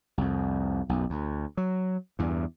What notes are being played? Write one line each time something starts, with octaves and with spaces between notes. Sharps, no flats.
C2 F2
B1 F#2
D2
F#3
E2 G2